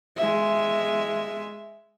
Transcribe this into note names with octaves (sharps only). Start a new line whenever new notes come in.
G#3 E5